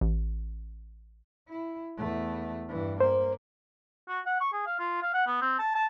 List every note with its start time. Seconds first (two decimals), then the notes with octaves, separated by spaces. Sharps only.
0.01 A1
1.49 E4
1.97 E2 A3
2.69 G2 E3
3.00 A#3 C5
4.09 F#4
4.26 F#5
4.41 C#6
4.53 G#4
4.66 F5
4.80 F4
5.02 F5
5.14 F#5
5.27 B3
5.42 C4
5.59 A5
5.75 A5